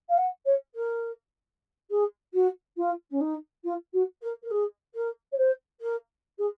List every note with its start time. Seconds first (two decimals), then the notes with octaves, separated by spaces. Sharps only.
0.09 F5
0.17 F#5
0.45 C#5
0.74 A#4
1.90 G#4
2.33 F#4
2.77 F4
3.10 C#4
3.20 D#4
3.64 F4
3.93 F#4
4.21 A#4
4.42 A#4
4.50 G#4
4.94 A#4
5.32 C#5
5.37 C5
5.80 A#4
6.38 G#4